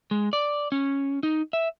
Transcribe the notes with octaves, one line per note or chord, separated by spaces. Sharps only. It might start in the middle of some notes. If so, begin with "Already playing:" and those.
G#3
D5
C#4
D#4
E5